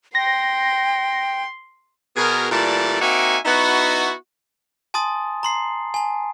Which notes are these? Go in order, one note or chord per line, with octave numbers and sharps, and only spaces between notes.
G5 C6 A#6
B2 G#4 A#4
A#2 E3 G3 A3 D5 A5
A#3 C4 D#4 F#4 E5 G#5
B3 D#4 E4 F#4
G#5 A5 C6 D#6 A6
A#5 C6 C7
G#5 A5